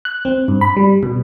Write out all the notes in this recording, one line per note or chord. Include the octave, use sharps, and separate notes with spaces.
F#6
C4
G2
B5
G3
B2